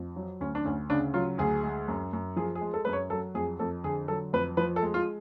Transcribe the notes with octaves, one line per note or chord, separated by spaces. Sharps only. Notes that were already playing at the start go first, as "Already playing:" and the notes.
Already playing: F2
F#3
D2 C#4
D4
D2 C#4
C#3 D4
F#3 F4
D2 G#4
G#3
F#2
F#2
F3 G#4
G#4
G#3
A4
F#2 B4
C#5
F#3 A4
F2 G#4
F2 A4
D3 G#4
F#3 A4
F2 B4
F3 B4
A4
G#3
F4